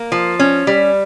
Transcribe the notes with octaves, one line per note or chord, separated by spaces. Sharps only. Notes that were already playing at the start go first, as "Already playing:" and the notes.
Already playing: A#3
F3
C#4
G3